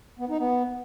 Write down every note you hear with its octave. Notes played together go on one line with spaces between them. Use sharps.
B3
D#4
B3